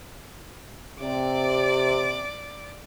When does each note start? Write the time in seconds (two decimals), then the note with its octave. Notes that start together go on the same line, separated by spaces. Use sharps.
1.00 C3 D5 D6